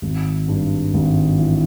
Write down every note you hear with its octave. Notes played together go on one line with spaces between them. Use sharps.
G#1
G2
G#1
E3